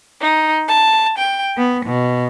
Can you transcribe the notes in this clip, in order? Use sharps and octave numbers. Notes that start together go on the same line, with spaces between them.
D#4
A5
G5
B3
B2